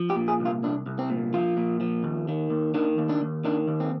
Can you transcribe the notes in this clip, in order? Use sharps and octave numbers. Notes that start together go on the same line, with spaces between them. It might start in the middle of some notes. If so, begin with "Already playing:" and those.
Already playing: F3
G4
A#2
G#4
C2
F4
C2 D4
C2
C4
A#2
F3 F4
A#2
F3
D#2
D#3
D#2
D#3 D4
D#2
D4
D#2
D#3 D4
D#2
C4